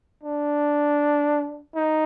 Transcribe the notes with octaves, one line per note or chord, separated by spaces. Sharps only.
D4
D#4